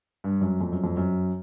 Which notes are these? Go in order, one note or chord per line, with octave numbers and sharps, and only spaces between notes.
G2
F#2
F2
F#2
F2
F#2